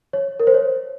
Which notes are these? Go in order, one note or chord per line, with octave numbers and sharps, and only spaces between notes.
C#5
A#4
C5
C#5